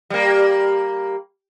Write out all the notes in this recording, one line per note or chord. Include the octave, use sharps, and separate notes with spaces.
G3 A#3